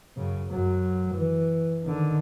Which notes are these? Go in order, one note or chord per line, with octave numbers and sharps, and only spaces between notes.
F#2 C#3
F#2 F#3
E3
D3 D#3